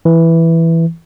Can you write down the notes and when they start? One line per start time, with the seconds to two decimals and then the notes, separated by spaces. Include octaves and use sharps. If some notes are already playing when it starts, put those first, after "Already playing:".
0.05 E3